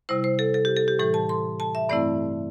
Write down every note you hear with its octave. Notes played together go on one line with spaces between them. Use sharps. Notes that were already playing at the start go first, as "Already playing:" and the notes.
C3 G3 E4 C5
C5
A4
A4
G4
A4
G4
A2 E3 G3 A4
A5
C6
A5
E5
G2 E3 A3 C4 E4 D5